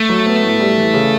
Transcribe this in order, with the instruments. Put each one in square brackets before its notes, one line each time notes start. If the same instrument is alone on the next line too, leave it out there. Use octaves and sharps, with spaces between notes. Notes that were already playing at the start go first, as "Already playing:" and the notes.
Already playing: [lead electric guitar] A3
[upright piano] F#3
B3
A2
G3
E3
C#3